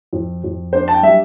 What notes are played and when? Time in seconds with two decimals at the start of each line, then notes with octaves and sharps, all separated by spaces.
0.13 F2
0.44 F2
0.73 D4 C5
0.88 A5
0.94 G5
1.03 G3 E5